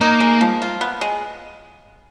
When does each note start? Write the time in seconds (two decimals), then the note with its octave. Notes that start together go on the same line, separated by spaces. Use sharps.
0.01 A#3 D#4
0.20 G#3
0.41 F3
0.62 F4
0.81 B3
1.01 G#3